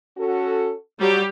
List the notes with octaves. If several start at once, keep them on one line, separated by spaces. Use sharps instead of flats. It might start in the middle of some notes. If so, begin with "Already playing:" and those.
C#4 F#4 A4
F#3 G3 G4